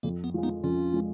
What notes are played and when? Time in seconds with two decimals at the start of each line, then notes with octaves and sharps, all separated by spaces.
0.03 F2 A#3
0.24 B3
0.34 F3 G#3
0.43 B3 D#4
0.63 F2 C#4 F4
0.93 F3 G#3